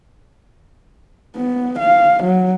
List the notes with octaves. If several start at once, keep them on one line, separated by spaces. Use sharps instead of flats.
B3
F5
F#3